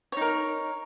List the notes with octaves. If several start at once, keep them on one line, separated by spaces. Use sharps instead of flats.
D#4 A#4 C#5